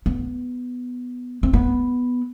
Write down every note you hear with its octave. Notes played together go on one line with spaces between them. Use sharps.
B3
C4
B3